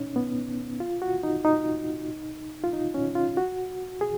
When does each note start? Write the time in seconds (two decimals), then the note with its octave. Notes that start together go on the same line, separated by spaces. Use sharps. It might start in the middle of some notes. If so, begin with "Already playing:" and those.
Already playing: C#4 D#4
0.16 B3
0.80 F4
1.02 F#4
1.24 D#4
1.45 D#4
2.64 F4
2.73 D#4
2.94 C#4
3.15 F4
3.37 F#4
4.01 G#4